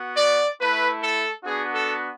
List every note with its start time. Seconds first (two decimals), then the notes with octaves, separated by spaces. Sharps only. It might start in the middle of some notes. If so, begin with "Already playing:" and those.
Already playing: B3 F#4
0.17 D5
0.59 A3 E4 B4
1.01 A4
1.43 B3 D4 F#4 G#4
1.72 A4